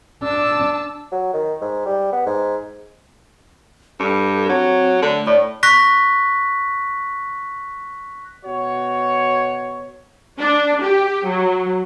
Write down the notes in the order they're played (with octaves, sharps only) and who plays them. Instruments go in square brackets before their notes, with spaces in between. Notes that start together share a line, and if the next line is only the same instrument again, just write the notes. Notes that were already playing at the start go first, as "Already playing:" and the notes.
[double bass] D4 [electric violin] A5 E6
[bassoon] F#3
D#3
G#2
G3
B3
G#2
[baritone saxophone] G2 [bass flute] A4
[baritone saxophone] F#3 [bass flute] C4
[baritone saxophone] D3 [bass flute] A3
[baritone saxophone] A2 [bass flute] D5
[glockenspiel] C#6 F#6 A#6 B6
[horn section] B2 F#4 C#5
[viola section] D4
G4
F#3